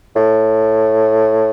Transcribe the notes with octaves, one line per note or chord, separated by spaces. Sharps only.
A2